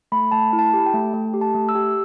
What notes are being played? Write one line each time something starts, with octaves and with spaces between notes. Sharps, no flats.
A3 B5
A3 A5
E4
A5
G4
G5
A3
A3
G4
A5
A3
E6
G4